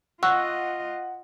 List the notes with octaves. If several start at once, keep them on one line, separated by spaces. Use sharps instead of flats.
F4 D#5 F#5 C#6 E6 F#6